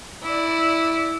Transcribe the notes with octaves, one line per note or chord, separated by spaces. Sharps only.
E4 D5